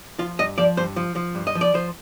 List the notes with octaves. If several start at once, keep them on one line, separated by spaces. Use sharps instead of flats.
F3 F4
G2 D#5
F3 D5
G2 C5
F3
F3
G2
D#5
F3
D5
F3 C5